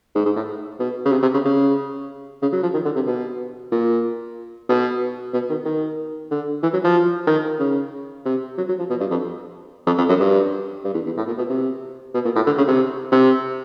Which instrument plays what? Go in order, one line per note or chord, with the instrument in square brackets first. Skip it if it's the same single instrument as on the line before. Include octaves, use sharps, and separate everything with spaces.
[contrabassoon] G#2
G#2
A2
B2
C#3
C3
C3
C#3
C#3
C#3
F#3
F3
D#3
D3
C3
B2
A#2
B2
B2
D#3
D#3
D3
E3
F#3
F3
D#3
C#3
C3
F#3
F#3
F3
B2
G2
F2
F2
F2
F#2
G2
G2
E2
E2
A2
A#2
B2
C3
B2
A#2
A2
D3
C#3
C3
C3